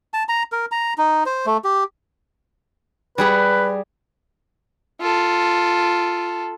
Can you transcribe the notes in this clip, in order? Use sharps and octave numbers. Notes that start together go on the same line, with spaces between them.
A5
A#5
A#4
A#5
D#4
C5
A3
G4
G3 G#4 B4 F#5
F4 A4